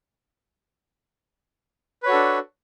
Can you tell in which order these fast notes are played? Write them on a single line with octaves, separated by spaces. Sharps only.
B4 C#5 F#4 A4 D4